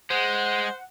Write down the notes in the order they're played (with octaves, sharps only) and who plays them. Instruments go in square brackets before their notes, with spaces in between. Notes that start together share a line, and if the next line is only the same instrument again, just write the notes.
[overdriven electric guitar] G#3 [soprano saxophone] C5 [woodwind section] F#5